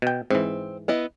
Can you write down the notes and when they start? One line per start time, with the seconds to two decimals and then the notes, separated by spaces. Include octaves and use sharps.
0.02 B2 G5
0.31 G#2 E3 C4
0.88 B3 E4 D#5